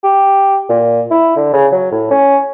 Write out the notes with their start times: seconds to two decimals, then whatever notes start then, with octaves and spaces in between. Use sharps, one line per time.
0.04 G4
0.69 A#2
1.11 E4
1.36 D3
1.53 C#3
1.72 F#3
1.92 A2
2.11 C#4